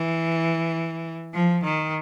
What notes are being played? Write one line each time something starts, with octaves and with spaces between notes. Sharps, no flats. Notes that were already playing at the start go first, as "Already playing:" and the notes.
Already playing: E3
F3
D#3